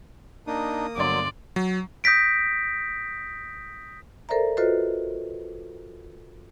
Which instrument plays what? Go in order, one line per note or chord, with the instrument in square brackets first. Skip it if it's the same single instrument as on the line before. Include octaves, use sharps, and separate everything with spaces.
[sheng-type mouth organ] A#3 D#6 [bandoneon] D4 D#4
[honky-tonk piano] G1 C6 [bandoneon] F#3 [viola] D5
[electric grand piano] F#3
[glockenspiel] D#6 G6 A#6 B6 D7
[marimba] A4 A#4 C5 D5 E5 A#5
F4 F#4 A4 B4 C5 D#5